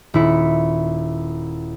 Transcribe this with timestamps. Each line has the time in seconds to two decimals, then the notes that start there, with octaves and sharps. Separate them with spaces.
0.14 D#1 E4 C#7